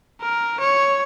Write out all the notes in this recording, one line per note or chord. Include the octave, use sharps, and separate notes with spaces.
A#4
C#5